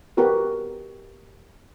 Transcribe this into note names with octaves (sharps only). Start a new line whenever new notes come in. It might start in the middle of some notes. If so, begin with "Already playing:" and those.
B3 F#4 G4 A#4 B4